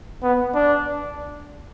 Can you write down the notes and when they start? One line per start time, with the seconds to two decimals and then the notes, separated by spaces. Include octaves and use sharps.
0.23 B3
0.55 D4